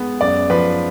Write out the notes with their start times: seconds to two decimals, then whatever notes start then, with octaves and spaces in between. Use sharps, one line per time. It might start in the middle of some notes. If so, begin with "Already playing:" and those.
Already playing: G#3 B3
0.21 F#2 D5
0.50 F3 B4